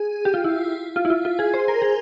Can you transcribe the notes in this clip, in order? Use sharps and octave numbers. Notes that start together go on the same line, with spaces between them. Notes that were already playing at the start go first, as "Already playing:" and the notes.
Already playing: G#4
G4
F4
E4
F4
E4
F4
F4
G#4
C5
A#4
G#4